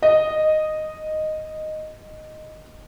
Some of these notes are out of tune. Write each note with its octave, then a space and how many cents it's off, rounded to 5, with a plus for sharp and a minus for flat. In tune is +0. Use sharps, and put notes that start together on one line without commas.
D#5 -5